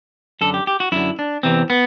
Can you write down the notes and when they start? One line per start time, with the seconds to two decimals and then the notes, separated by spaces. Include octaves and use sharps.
0.41 F#2 D3 A4
0.54 G4
0.67 G4
0.80 F#4
0.92 F#2 D3 E4
1.19 D4
1.43 E2 C3 E3 C4
1.70 B3